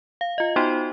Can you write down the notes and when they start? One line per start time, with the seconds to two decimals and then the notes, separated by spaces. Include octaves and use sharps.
0.21 F5
0.38 F4 D#5
0.56 B3 D#4 F#4 C5 G5 C6